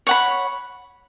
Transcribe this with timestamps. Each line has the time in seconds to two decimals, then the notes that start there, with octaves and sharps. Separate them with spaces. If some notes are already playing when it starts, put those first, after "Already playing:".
0.07 C#5 F#5 B5